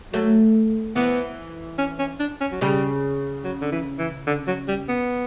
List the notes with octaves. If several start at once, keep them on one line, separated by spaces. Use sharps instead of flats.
F#3 A3
E3 B3
C#4
C#4
D4
C#4
F#3
C#3 G3
F#3
D3
E3
E3
D3
F#3
G3
B3